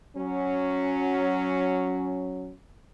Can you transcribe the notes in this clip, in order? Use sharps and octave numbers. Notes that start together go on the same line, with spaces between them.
F#3 C#4